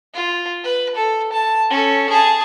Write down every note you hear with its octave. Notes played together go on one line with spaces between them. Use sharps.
F4
B4
A4
A5
C#4 A4
G#4 A5